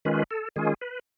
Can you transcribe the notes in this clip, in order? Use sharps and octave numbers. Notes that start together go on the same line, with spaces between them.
D#3 G#3 C#4 F4 B4
A4
D#3 G#3 C#4 F4 G#4
B4